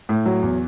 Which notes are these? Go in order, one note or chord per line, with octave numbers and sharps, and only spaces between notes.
A2
F#3
E2